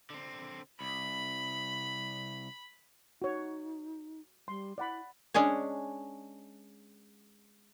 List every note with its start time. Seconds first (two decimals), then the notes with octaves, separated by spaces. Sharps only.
0.10 D3 C4
0.81 C2 B5
3.22 D#4 F#4 C#5
4.48 G3 C6
4.78 E4 D5 F#5 B5
5.34 G#3 C#4 D4 G#4 C#5